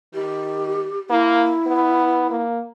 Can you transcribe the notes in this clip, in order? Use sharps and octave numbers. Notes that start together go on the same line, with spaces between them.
D#3 G4
A#3 E4
B3
A#3